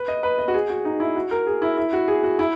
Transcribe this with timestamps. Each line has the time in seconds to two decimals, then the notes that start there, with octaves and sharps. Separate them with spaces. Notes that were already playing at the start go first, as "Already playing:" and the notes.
Already playing: B4
0.08 D#5
0.23 B4
0.39 D#5
0.48 F#4
0.54 G#4
0.69 F#4
0.85 D#4
1.00 E4
1.16 F#4
1.31 A#4
1.47 G#4
1.62 E4
1.77 E4
1.93 F#4
2.08 G#4
2.23 F#4
2.39 E4